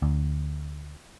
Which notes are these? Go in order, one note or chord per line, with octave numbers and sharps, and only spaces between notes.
D2